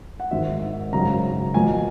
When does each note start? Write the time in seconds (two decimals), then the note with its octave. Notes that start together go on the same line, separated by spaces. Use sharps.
0.20 F#5
0.31 G#1 G#2 D#3 E5
0.92 G#1 F#2 C#3 A#5
1.54 B1 A#2 G#5